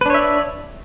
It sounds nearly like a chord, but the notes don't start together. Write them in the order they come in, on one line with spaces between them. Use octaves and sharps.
B4 D4 C#5 E5 D5